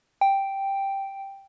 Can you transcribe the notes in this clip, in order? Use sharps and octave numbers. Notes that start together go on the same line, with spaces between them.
G5